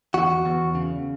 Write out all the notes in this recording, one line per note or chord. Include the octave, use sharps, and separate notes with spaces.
E2 F#4
E2
C#3